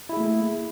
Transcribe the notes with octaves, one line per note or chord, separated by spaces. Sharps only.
A3 A#3 E4 G#4